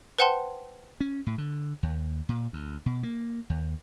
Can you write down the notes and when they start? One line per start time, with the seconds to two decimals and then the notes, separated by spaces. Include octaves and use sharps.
0.18 B4 C5 F#5 G5 A5 C6
1.00 C#4
1.27 A2
1.38 D3
1.83 D#2
2.29 A#2
2.53 D2
2.86 B2
3.03 A#3
3.50 D#2